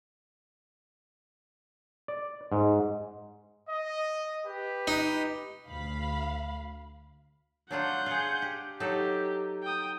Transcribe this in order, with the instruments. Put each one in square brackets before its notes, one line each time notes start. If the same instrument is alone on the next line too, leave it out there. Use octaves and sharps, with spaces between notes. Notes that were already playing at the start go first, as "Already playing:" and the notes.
[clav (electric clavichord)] D5
G#2
[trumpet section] D#5
G4 B4
[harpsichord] D#4
[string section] D2 F5 B5
[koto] F#3 D4 F4 [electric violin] F#5 G6
[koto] F4 G#4
G4
[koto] F#3 D#4 A4 [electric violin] G4
[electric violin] G5 D#6